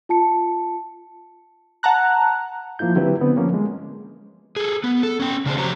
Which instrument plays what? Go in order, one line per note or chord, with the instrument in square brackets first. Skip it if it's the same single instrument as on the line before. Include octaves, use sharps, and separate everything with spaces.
[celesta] F4 A5 C#7
[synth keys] F#5 A5 A#5 F#6
[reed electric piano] F3 A#3 E4 F4 G6
D3 F#3 C4 E4 G4 B4
D3 B3 C4
F3 A#3 C#4
G#3
[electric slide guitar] G#4 A4
B3
A4
C#4 G5
C#3 C4 D4 G#4 C5
F3 F#4 G4 C5 C#5 A#5